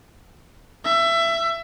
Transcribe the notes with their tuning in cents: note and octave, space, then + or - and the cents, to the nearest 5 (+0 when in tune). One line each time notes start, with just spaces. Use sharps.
E5 +20